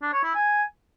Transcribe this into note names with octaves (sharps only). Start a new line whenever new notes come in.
D4
C#5
E4
G#5